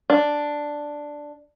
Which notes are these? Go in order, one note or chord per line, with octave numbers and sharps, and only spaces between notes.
D4